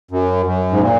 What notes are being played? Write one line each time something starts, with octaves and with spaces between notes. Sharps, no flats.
F#2
F#2
G#2
A#2